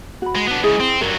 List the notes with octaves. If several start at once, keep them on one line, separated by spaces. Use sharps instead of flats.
F#4 B5
G#3
B3 D4
G#2 C#3 E4 G#4
C4
G2 F#3 A#4